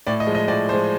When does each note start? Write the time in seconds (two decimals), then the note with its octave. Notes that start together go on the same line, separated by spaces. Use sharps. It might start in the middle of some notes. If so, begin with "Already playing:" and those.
0.07 A2 D5
0.20 D#5
0.27 F3 G#3
0.35 D#5
0.48 A2 D5
0.69 F3 G#3 C5